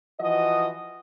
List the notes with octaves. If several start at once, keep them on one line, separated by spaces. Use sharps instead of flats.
E3 F3 F#4 D#5